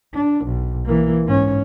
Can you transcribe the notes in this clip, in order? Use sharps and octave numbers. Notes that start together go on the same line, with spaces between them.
D4
B1
E3 A#3
G#2 C#4